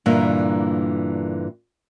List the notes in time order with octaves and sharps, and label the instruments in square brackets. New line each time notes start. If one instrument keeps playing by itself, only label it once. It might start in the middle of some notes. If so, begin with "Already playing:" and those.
[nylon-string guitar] G2 A#2 D3 E3 A#3